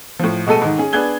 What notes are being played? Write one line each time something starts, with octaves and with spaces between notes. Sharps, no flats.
A2 F3
B2 G#3 A3 A4 D#7
G#2 D#3
C#4 G#4
B3 D4 G#4 F#6 G#6 G7